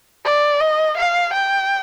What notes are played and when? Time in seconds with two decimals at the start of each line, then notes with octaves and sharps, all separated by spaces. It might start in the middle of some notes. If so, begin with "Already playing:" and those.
0.25 D5
0.61 D#5
0.97 F5
1.34 G5